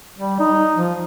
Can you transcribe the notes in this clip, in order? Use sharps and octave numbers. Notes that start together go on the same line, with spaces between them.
G3
D#4
F3